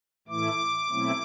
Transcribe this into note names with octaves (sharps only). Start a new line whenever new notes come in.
A2 E3 A3 E4 D6
B2 F#3 A3 C4 E4